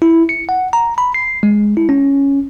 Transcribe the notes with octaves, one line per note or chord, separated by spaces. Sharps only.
E4
C#7
F#5
A#5
B5
C7
G#3
E4
C#4